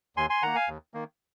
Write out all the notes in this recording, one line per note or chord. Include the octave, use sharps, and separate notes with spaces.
D#2 G#5 C6
G#5 C6
D#3 A#3 F#5 A#5
F5 G#5
D#2
D#3 A#3